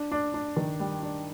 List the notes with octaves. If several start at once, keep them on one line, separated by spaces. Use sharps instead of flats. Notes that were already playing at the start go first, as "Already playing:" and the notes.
Already playing: D4
D4
D4
D#3
G3
D4